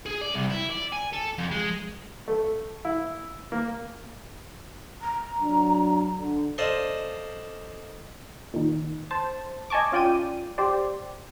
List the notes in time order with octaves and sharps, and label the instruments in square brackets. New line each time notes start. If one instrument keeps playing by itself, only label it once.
[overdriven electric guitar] G#4
D5
C2
E4
D5
G#5
A4
F2
G#3
[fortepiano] A3
E4
A#3
[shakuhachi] A#5
[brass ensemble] F#3 D4
D3
[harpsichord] A4 C5 D5 D#5 F5
[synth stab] A#2 D#3
C5 A5
D#5 G#5 A5 C#6 D6
C#4 F4 D5 G5 D#7
G4 C5 D5